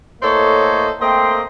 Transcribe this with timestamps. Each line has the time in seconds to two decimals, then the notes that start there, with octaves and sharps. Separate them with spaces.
0.22 A2 A#3 A4 C5 C#5 D#5
1.00 A3 A#3 C4 D#5 G5 C6